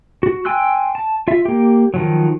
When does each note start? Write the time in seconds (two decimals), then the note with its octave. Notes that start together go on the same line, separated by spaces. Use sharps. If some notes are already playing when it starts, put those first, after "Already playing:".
0.23 F#4
0.45 G5 G#5 C6 E6 F#6
0.95 A5
1.28 F4 E5
1.45 A#3 G4
1.94 D#3 F3 F#3